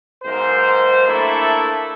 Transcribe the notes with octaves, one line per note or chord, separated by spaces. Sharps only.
B1 G#2 A#4 C5
A3 A#3 D4 E4 A4